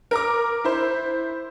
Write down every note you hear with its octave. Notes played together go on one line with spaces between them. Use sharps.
A#4 A#5 D6
E4 C5